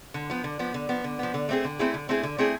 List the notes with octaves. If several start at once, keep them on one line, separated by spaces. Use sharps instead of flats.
D3
F3 B3
D3
F3 B3
D3
F3 B3
D3
F3 B3
D3
A3 C4 E4 G#4
D3
A3 C4 E4 G#4
D3
A3 C4 E4 G#4
D3
A3 C4 E4 G#4